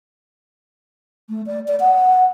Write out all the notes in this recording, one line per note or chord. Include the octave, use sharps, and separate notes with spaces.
A3
D5
D5
F#5